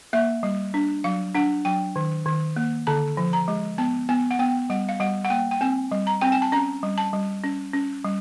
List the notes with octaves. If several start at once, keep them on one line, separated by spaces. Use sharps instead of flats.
A#3 E5
G3
D4
F#3 F5
D4 F#5
F#3 G5
D#3
D#3
A#3
D3 A5
F3
A#5
G#3
B3 A5
B3 G#5
F#5
B3 G5
G3 F#5
F5
G3 F#5
F#5
A#3 G5
G5
C4 G#5
G3
A#5
C4 G5
G#5
A5
C#4 A#5
G3
A5
G3
C#4
C#4
G3